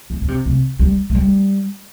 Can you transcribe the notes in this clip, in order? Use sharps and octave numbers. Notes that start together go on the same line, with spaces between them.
E3
D3
C3
C3
G3
A3
G3